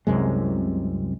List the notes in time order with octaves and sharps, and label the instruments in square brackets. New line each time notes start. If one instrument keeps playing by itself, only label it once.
[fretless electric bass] C2 F#2 C3 G#3